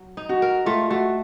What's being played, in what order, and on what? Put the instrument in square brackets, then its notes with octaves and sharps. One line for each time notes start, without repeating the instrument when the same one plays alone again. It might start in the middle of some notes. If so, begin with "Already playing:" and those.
Already playing: [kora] F#3
D#4
[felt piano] F#4
[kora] A#4
[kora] A3 [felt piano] F4
[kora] A3 [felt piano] F#4